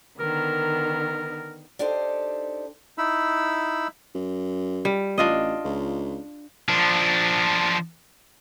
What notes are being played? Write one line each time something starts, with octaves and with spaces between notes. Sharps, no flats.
D3 D#3 B3 A#4
D4 D#4 G4 A4 C5
D#4 E4 B5 E6
F#2
G3
A1 D4 F4 D#5
C#2
F3 D4